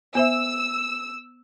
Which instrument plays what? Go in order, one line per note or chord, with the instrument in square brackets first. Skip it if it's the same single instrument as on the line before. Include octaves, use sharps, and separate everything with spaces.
[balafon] B3 C5 E5 [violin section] E6